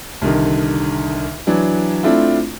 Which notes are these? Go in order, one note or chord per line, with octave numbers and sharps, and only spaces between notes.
C2 D3 D#3
E3 F#3 D4
A3 C4 D4 E4 F4